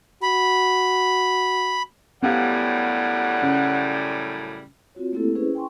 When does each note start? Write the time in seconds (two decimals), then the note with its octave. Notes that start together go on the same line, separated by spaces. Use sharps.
0.22 F#4 B5
2.22 F#2 A2 G3 B3 G4 F5 F#5
3.42 C#3
4.95 C4 F4 F#4 C#5
5.12 A3 A#3 C4 E4 G4 A4
5.35 C#4 E4 G#4 B4 C5
5.55 G5 G#5 C6 C#6